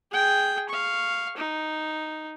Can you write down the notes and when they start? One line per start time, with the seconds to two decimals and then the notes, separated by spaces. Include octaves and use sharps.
0.11 G#4 G5
0.69 F5 C#6
1.37 D#4